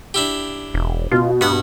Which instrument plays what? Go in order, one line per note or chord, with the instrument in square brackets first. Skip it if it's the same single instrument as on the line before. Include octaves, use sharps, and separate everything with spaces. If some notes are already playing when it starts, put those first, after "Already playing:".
[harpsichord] D4 E4 G4
[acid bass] E1
[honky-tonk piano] B2 [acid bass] F4
[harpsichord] G2 F#5 [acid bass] B3